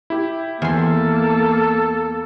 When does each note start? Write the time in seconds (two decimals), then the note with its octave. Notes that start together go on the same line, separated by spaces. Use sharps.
0.10 E4 G4
0.62 E2 A#3 A4 C6